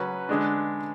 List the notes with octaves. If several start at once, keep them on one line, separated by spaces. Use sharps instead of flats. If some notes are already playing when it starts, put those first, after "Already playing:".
Already playing: C#3 F#3 C#4 B4
D3 G#3 D4